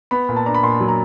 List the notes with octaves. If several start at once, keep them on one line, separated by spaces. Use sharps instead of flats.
B3 B5
A#2
A5
D4 A#5
B5
A#2 C6
F#3
A#5